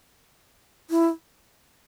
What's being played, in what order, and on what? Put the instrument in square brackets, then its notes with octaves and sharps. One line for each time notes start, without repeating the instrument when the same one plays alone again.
[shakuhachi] E4